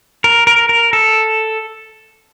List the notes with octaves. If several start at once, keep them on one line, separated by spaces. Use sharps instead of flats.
A#4
A#4
A#4
A4